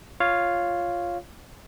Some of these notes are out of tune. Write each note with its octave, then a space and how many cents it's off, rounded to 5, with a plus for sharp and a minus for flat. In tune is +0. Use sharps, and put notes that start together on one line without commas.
F4 +0 C#5 +0 F5 +0